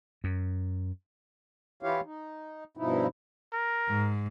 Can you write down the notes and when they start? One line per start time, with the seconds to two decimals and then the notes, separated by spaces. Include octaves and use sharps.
0.24 F#2
1.83 E3 E4 F4 G4 C#5 F5
2.05 D#4
2.77 G2 B2 F3 D#4 E4
3.53 A#4
3.88 G#2